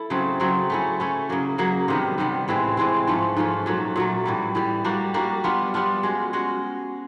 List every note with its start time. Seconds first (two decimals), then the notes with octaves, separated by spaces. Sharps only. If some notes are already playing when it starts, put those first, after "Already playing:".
Already playing: E4 A4
0.10 C#3 F#3 A3 C4
0.40 C#3 F#3 A3 C4
0.70 A3 C#4 E4
1.00 A3 C#4 E4
1.29 C#3 F#3 A#3
1.58 C#3 F#3 A#3
1.88 C3 D#3 G3 B3
2.18 C3 D#3 G3 B3
2.48 A2 E3 G#3 C4
2.77 A2 E3 G#3 C4
3.07 G#2 F3 A3 C#4
3.36 G#2 F3 A3 C#4
3.66 A#2 F#3 A3
3.96 A#2 F#3 A3
4.26 A2 E3 G3
4.55 A2 E3 G3
4.84 G3 A#3 D4 F#4
5.14 G3 A#3 D4 F#4
5.44 G3 B3 D4 F4
5.74 G3 B3 D4 F4
6.03 G#3 C#4 F#4
6.33 G#3 C#4 F#4